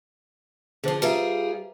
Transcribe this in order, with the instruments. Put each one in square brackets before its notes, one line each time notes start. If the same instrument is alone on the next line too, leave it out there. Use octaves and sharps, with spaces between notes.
[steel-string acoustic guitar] D3 F3 [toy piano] G#4 C5
[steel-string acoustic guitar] G3 F4 G#4 [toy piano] B4 E5 A#5